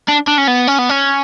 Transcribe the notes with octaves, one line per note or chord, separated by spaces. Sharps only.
D4
D4
C#4
B3
C#4
B3
C#4